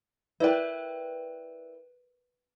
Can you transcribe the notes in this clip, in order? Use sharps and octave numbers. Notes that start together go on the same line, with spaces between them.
E4 A#4 B4 D5 G5